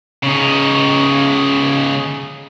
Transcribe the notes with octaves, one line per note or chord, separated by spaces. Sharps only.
C#3 D#4